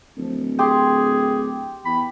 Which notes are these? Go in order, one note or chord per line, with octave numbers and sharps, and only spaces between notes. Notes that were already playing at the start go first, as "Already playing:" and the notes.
D1 F3
G4 G#4 C6
E2 B5